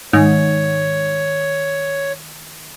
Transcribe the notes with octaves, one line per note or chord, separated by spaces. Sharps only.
G#2 D#3 C#5